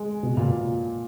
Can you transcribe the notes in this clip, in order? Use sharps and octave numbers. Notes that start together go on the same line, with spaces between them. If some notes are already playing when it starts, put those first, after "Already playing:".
Already playing: G#3
B2
A#2